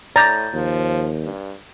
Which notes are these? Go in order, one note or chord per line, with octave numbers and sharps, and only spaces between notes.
A2 D5 A#5 D6 G6 A6
D#2 F3
G2